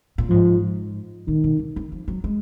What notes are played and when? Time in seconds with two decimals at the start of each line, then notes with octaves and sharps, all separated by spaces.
0.18 A#2
0.29 G#2 F3
1.27 A#2 D#3
1.44 B2
1.59 D3
1.76 D#3
1.92 F3
2.08 F#3
2.24 G#3